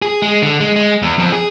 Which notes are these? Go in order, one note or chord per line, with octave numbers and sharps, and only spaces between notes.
G#4
G#3
D3
G#3
G#3
E2
F2
G#4